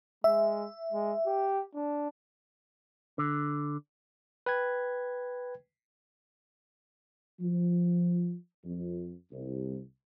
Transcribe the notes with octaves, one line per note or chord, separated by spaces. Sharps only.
G#3 E5
G#3
G4
D4
D3
B4 G5 G#6
F3
F2
C2